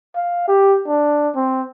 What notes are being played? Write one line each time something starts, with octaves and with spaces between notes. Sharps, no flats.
F5
G4
D4
C4